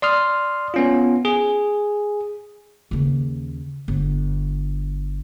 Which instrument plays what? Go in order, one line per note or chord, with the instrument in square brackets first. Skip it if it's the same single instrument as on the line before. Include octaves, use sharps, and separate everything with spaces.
[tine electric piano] D5 C6 D#6 F6
B3 C#4 F4
G#4
[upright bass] D#2 C#3
G1